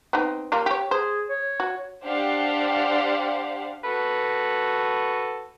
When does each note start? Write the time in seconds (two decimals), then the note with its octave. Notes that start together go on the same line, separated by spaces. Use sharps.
0.13 B3 C4 D#4
0.52 G3 A#3 F4
0.66 G4 C#5
0.91 G#4 C5
1.30 C#5
1.60 F#4
2.04 D4 G4 C5 F5 F#5
3.84 F#4 A4 B4